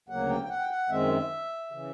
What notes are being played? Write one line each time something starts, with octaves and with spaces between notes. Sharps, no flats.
D2 C#3 F#3 A#3 F#5
G5
G5
F#5
G5
F#5
F#2 D#3 G#3 C4 E5
C#3 E3